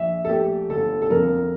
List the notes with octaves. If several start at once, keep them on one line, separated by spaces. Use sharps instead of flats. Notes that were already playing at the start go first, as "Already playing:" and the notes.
Already playing: A#1 E5
A4
A3 G4
G1 A4
A4
F2 A#4